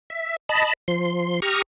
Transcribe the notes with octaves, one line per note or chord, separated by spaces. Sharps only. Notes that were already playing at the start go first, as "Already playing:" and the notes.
E5
D#5 A5 B5
F3 C6
G4 A#5 C#6 D#6 F6